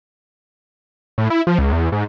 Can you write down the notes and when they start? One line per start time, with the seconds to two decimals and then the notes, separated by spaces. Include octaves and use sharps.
1.18 A2
1.30 E4
1.47 F3
1.59 C#2
1.72 E2
1.92 G#2